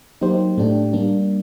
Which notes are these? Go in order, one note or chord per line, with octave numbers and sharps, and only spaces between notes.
F#3 A#3 D#4 G4 C5
A2 A3 D4 G4
G3 A#3 D4